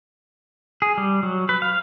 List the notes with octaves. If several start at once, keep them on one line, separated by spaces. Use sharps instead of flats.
G#4
G3
F#3
B4
F5